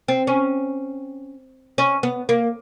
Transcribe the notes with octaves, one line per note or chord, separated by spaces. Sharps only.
C4
C#4
C#4
B3
A#3